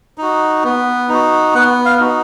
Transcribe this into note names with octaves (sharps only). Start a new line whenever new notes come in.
D#4 F#4
B3
D#4 F#4
B3 F#5
F5
D#4 F#4